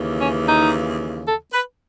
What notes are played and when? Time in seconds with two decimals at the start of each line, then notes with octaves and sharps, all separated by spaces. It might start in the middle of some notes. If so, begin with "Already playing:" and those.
Already playing: D#2 C#3 E3
0.21 C#4
0.47 D#4
1.25 A4
1.52 B4